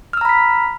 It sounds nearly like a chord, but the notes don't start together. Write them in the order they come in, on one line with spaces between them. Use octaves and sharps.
F6 E6 A#5 B5 B6